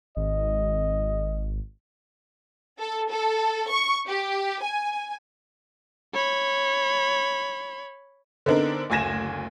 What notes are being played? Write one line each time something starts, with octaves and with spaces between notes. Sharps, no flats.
G#1 D#5
A4
A4
C#6
G4
G#5
C#5 B5
D3 B3 C4 D4 D#4 A#4
F#1 D2 G#5 G#6 A#6 E7